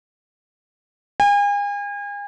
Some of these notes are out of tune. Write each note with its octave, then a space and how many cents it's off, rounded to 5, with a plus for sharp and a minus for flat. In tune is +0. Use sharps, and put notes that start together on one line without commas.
G#5 -40